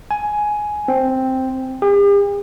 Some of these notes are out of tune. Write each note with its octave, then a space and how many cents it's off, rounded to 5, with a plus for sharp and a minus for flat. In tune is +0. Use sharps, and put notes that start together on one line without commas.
G#5 +10
C4 +0
G4 +45